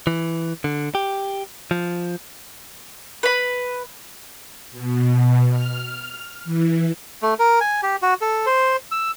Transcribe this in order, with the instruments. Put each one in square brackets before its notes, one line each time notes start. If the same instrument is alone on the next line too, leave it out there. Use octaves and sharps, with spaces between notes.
[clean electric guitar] E3
D3
G4
F3
[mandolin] B4 B5
[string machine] B2
F6
E3
[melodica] A3
A#4
G#5
G4
F#4
A4
C5
E6